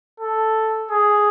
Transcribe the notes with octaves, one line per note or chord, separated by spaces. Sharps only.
A4
G#4